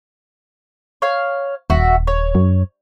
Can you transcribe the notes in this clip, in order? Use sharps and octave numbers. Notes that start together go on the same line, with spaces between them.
C#5 F5
D#1 F#4 E5
C#5
F#2